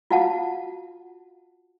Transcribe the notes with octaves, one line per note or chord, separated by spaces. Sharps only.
F4 F#4 F5 F#5 A5